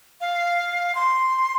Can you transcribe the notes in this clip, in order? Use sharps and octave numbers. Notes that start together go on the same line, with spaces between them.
F5
C6